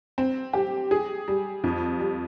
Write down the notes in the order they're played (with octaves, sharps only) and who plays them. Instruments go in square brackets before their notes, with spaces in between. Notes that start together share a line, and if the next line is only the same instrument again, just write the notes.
[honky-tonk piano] C4
G4
G#4
G3
F2
G3